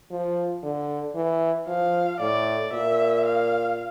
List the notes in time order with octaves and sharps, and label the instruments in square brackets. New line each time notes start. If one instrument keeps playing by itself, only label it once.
[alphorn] F3
D3
E3
[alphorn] F3 [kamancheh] F5
[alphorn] A2 [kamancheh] D5
[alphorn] A#2 [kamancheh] E5
[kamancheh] F5